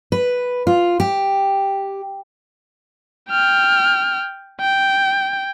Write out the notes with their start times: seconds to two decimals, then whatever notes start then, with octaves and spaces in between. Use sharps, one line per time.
0.12 B4
0.67 F4
1.00 G4
3.30 G5 F6
4.61 G5